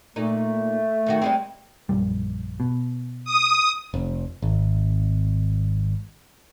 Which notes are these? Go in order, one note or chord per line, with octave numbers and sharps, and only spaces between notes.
A#2 A3 D#4
F2 D#3 F#4
G3 G#3 C4
A#1 F#2 G3
B2
D#6
F1
G#1